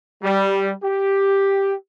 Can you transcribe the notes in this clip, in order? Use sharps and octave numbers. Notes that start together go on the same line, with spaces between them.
G3
G4